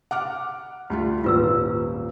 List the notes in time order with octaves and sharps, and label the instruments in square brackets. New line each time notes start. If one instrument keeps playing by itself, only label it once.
[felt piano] F#5 D6 F6
D2 G3 F4
[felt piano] D#1 G#1 [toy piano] F4 B4 E6